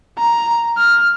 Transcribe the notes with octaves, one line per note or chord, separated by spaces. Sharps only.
A#5
F6